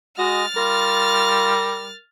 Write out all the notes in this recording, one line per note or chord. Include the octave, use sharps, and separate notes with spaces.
G#3 F#4 D#5 F6 A6
G3 F4 A#4